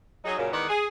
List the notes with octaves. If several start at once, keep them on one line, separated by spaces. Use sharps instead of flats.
F#3 D#4 G#4
F#2 A#2 C#3
E2 D#3 G#3 B3 D5 F#5
G#4